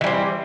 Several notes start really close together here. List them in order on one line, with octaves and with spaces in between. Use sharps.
E3 G3 C4